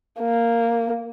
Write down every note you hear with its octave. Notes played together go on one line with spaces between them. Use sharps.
A#3